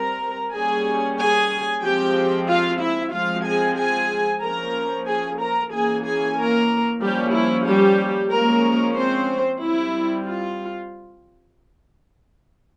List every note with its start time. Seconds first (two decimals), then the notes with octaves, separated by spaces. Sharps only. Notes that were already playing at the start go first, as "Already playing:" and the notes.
Already playing: G3 C4 A#4 A#5
0.54 G3 A#3 C#4 G#4 G#5
1.19 G#4 G#5
1.83 F3 G#3 C4 G4 G5
2.49 F4 F5
2.81 E4 E5
3.13 F3 G#3 C4 F4 F5
3.45 G#4 G#5
3.78 G#4 G#5
4.42 F3 A#3 C#4 A#4 A#5
5.07 G#4 G#5
5.40 A#4 A#5
5.72 E3 A#3 C#4 G#4 G#5
6.05 G#4 G#5
6.37 A#3 A#4
7.01 F3 G3 A#3 C#4 G4
7.34 E4
7.67 G3 G4
8.31 F3 G#3 A#3 C#4 A#4
8.97 C4 C5
9.62 G3 C4 E4
10.26 F4